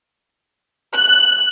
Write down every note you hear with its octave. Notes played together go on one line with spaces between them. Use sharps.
F#6